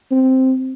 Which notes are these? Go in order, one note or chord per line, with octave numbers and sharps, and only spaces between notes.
C4